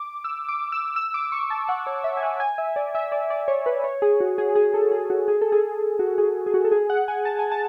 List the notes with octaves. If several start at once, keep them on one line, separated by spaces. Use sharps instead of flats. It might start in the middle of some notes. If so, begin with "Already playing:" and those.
Already playing: D6
E6
D6
E6
E6
D6
C#6
A5
F#5
C#5
E5
G#5
F#5
G#5
E5
D5
E5
D5
D5
C#5
B4
C#5
G#4
F#4
G#4
G#4
A4
G#4
F#4
G#4
A4
G#4
F#4
G#4
G#4
F#4
A4
G#4
F#5
G#5
A5
G#5
A5